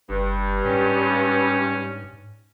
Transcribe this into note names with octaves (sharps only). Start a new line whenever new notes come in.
F#1 G2
G#2 C#4